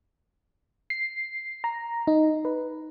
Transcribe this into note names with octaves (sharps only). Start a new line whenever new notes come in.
C7
A#5
D#4
B4